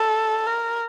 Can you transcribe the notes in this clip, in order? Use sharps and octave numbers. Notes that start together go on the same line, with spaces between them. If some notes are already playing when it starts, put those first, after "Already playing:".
Already playing: A4
A#4